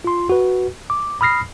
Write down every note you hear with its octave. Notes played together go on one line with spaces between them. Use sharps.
F4 C6
F#4 B4
D6
B5 D#6 F6 A#6 C7